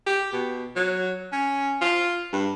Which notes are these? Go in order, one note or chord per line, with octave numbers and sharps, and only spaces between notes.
G4
B2
F#3
C#4
F4
G2